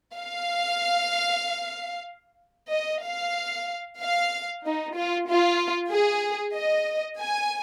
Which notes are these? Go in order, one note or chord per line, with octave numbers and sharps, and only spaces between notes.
F5
D#5
F5
F5
D#4
F4
F4
G#4
D#5
G#5